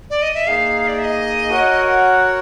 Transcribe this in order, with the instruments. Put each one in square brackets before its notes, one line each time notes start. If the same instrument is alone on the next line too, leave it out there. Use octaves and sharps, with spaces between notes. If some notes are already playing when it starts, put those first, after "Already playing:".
[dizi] D5
D#5
E5
[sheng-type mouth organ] A#3 D#4 G#4 [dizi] F5
[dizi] D5
E5
D#5
[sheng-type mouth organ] F#4 A#4 C#5 F#5